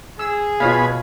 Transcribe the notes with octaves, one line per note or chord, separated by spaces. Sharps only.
G#4 E6
B2 B3 F4 C#5 F5 G#5 B5